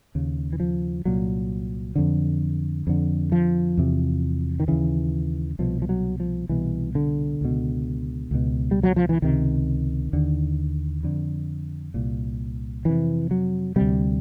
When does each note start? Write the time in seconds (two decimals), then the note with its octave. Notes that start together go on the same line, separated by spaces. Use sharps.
0.15 D#2 C#3
0.53 E3
0.60 F3
1.05 C2 A#2 F#3
1.96 F2 D3
2.87 F2 D3
3.32 F3
3.77 E2 C3
4.60 D#3
4.68 D#2 C#3 E3
5.59 C2 B2 F3
5.82 F3
5.89 F#3
6.20 F3
6.49 C2 B2 E3
6.95 D3
7.41 C#2 B2
8.31 C#2 B2
8.71 G3
8.83 F#3
8.96 F3
9.09 E3
9.22 C#2 C3 D#3
10.13 D#2 D3
11.03 F2 D3
11.94 C2 A#2
12.85 F2 C3 E3
13.31 F#3
13.76 D2 C3 G3